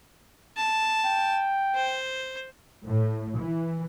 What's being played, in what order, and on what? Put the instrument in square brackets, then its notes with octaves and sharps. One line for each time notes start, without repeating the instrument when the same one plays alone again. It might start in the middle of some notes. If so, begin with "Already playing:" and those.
[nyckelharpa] A5
[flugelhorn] G5
[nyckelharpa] C5
[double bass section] A2
E3